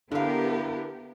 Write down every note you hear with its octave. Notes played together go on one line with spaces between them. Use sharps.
A#2 D3 B3 E4 G4 A#4 F5